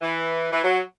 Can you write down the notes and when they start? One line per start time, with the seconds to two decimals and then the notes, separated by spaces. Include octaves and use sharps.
0.02 E3
0.51 E3
0.62 F#3